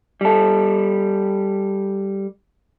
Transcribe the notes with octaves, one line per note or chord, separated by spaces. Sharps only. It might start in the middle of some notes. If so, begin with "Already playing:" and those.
G3 A4